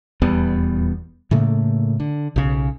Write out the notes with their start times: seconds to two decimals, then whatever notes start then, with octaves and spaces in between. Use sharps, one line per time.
0.22 D#1 E2 G3 B3
1.31 A2 C#3 A3 A#3
2.00 D3
2.36 B1 C#3